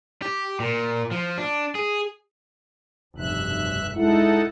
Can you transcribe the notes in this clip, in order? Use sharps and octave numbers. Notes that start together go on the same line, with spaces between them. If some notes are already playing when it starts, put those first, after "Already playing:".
G4
A#2
F3
D4
G#4
F1 B1 G2 E5 F#6
G#3 D#4 E4 A4 F#5